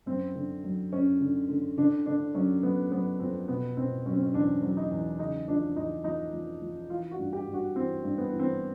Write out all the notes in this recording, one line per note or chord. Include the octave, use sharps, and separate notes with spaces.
F#2 C4
D3
F#3
F#2 C#4
D3
D3
D3 D4
D3 D4
F#3 C#4
F#3 B3
F#3 B3
F2 C4
B2 B3
B2 C4
F#3 C#4
C4
C#4
E2 D4
F#3
D#4
E2
C#3 D#4
F3 D4
E2 D#4
F3 D#4
F3
F3
E3 F4
F#4
G2
G4
G2
F#4
E3 C4
G2
B3
E3
C4